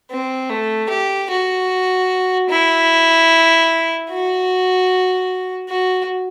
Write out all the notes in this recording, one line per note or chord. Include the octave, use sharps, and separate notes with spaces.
C4
A3
G4
F#4
E4
F#4
F#4